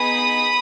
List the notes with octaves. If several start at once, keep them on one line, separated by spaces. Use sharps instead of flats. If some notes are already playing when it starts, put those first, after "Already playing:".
Already playing: B3 D#4 G#4 B5 D#6